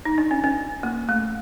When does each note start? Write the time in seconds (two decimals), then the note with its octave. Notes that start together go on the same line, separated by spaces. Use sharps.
0.05 D#4
0.18 D4
0.31 C#4
0.44 C#4
0.83 A#3
1.09 A3